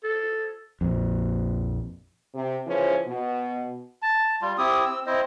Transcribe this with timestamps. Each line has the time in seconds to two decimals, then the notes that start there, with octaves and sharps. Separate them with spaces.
0.04 A4
0.81 A#1 F2
2.35 C3
2.67 C#3 E3 F3 C#4 C5
3.08 B2
4.02 A5
4.42 G3 F4
4.58 C4 E4 G4 D#6
4.85 C4 E6
5.06 C4 E4 C5 D#5